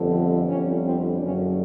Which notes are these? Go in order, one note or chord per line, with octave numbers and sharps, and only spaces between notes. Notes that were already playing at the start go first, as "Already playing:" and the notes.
Already playing: G1 F2 D3
C4
G1 F2 D3 G3 C#4
C4
F#1 F#2 D3 F#3 C#4